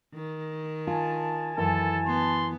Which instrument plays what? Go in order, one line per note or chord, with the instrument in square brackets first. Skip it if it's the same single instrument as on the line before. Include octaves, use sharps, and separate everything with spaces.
[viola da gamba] D#3
[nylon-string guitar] F4 [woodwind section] G#5 A5
[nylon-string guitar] F#2 E3 E4 [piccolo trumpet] A4
[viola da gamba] B3 [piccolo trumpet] C6